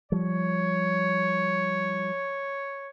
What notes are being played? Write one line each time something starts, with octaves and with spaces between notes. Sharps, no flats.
F3 G3 C#5